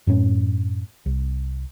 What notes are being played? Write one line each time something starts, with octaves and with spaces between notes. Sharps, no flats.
F#2 A2 C#4
C2